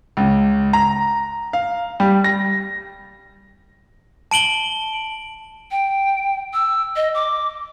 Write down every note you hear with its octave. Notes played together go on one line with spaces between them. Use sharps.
C#2
A#5
F5
G3
A#6
A5 D7 F#7 G7
G5
E6
D#5
D6